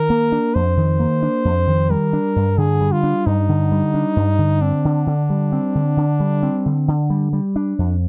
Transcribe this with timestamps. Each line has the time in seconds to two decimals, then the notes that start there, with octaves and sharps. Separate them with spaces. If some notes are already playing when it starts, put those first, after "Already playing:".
Already playing: D#3 A#4
0.10 A#3
0.32 D4
0.54 F2 C5
0.77 D#3
1.00 A#3
1.23 D4
1.45 F2
1.67 D#3
1.90 G3 A#4
2.13 D4
2.36 G2
2.58 D3 G#4
2.81 G3
2.92 F4
3.03 D4
3.26 G2 D#4
3.49 D3
3.72 G3
3.94 D4
4.16 G2
4.39 D3
4.61 C4 D4
4.85 D3
5.07 D3
5.30 G3
5.52 C4
5.75 D3
5.97 D3
6.20 G3
6.43 C4
6.66 D3
6.88 D3
7.10 G3
7.33 G3
7.56 D4
7.79 F2